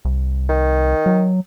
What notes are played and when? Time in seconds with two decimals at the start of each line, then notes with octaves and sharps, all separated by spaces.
0.05 C2
0.49 D#3
1.06 F#3